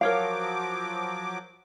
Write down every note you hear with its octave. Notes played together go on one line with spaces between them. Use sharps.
F3 F#3 A#4 C#5 F5 D6